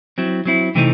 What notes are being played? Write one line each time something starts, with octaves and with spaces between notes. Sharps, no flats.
F#3 C4 E4
F#3 C4 E4
C3 E3 A3 C4 D#4